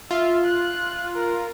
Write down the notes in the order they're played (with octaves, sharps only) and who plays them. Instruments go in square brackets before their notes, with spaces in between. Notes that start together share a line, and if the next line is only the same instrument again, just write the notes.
[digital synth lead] F4 [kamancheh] E5
[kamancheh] F#6
A#4